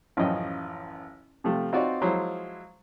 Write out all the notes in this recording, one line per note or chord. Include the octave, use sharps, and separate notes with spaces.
A1 F#2 F3 C#4 D#5 G5
C3 F3 G3 A3
C4 D#4 F4 F#4 C#5 D5
F3 F#3 G#3 E4 C5